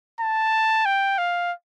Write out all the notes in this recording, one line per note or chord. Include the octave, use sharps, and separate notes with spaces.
A5
G5
F5